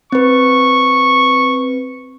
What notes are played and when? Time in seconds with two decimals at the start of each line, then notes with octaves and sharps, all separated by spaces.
0.12 C4 B4 C#6